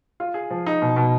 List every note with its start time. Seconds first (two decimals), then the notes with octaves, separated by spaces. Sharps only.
0.20 F4
0.34 G#4
0.50 F3
0.66 D#4
0.82 B2
0.96 B2